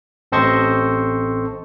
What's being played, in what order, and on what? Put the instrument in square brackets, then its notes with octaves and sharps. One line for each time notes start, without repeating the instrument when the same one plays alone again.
[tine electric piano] A1 C4 A4 C5 D#5 C#6